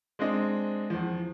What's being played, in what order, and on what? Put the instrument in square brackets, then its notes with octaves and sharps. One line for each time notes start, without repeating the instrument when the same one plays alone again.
[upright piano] G#3 C4 D4 D#5
E2 F3